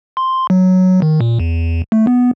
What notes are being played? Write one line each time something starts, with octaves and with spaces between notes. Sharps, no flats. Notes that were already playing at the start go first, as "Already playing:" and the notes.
C6
F#3
D#3
A#2
E2
A3
B3